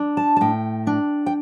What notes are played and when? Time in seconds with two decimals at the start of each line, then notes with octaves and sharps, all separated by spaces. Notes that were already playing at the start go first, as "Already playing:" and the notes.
Already playing: D4
0.17 A5
0.37 A5
0.41 A2 G5
0.87 D4
1.26 G5